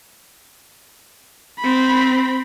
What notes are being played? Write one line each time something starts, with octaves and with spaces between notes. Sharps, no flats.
C4 B5